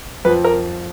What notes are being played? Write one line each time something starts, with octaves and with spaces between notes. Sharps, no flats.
F2 F3 B4
A#4